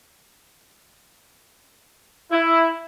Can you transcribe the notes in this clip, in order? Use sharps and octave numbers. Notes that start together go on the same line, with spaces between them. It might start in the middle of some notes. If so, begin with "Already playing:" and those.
E4